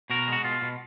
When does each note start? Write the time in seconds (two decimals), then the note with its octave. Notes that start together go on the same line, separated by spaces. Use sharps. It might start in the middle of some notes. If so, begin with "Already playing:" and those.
0.10 B2 F#4 A#4
0.28 G#3 F#4
0.44 B2 F4
0.62 B2